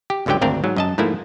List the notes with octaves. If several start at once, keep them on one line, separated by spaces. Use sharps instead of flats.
G4
G1 C#2 D3 F#3 G4 G5
G#1 D2 C4 D4 A#4 F5
G#2 F#3
F#2 D#5 A5
G#2 F3 A3 A#3 E4